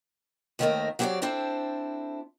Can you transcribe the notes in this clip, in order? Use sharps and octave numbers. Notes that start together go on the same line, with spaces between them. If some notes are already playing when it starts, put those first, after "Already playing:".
D#2 D#3 A3 C4 A#4 D#5
F#3 C4 G4 B4 C#5 D5
C4 D4 E4 A4 C5